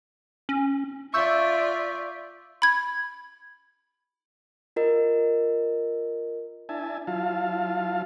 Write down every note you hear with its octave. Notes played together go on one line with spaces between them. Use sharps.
C#4
F4 D5 E5 C#6 E6 G6
B5 G#6
F4 A#4 D#5
D4 E4 E5 G#5 A5
F#3 E4 F4 F5 A5